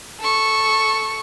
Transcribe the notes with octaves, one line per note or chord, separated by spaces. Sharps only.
A4 C#6